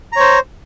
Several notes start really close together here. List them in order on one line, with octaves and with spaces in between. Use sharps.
A#5 C#5 C5